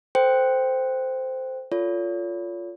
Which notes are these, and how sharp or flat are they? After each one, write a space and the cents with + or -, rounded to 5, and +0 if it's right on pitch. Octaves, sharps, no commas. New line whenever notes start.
A4 +15 C5 -10 G5 +0
F4 +0 A4 +20 C#5 +40